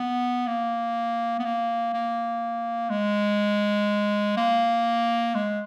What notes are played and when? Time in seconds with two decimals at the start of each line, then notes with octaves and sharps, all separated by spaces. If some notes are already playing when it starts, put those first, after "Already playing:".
Already playing: B3
0.47 A#3
1.39 B3
1.44 A#3
1.93 A#3
2.90 G#3
4.37 A#3
5.35 G#3